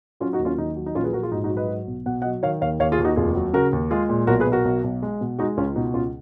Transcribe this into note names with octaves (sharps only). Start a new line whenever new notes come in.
F#3 C#4 F4
D#4 F#4
D#2
C#4 F4
D#3 D#4
F#3
D#4
A#1 C#4 F4
G#4 B4
A#1 F#4 A#4
F4 G#4
G#2 D#4 F#4
D#4 F#4
F#3
B4 D#5
F#3
B1
B2 F#5
D#5 F#5
F#3
D#3 C#5 F5
D#2 C#5 F5
D#2 C#5 F5
F4 G#4
D#2
D#4 F#4
F1 F4 G#4
F#3
C#3 F#4 A#4
D#2
G#3 F4 G#4
A#2
B1 F#4 A#4
G#4 B4
B1
F#4 A#4
B1
B1
G#3
B2
G#3 D#4 F#4
C#2 C#4 F4
B2 D#4
C#2 C#4 F4